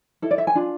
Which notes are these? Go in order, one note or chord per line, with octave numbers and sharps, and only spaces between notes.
E4 A4
D5
E5
G#5
D4 F4